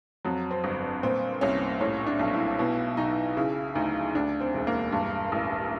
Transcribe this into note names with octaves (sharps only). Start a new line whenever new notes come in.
F2 F#3
C4
G1
A#2 C4
C2 C#4
A2 C#4
D4
B1
E4
B2 E4
B1 D#4
C#3 E4
D2 D#4
D2 D4
C4
E1
A#3
G2
A1